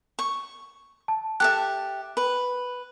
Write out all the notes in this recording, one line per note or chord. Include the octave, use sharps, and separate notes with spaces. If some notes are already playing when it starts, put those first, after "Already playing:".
C#6
A5
G4 A4 E5 F#6
B4